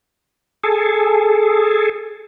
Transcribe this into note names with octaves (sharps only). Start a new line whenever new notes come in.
G#4 A4